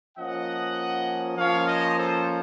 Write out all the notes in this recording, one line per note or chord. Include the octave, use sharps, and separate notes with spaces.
F3 A#3 C#4 D#5 F#5
F3 A#3 C#4 C#5 F5
C5 D#5
A4 C5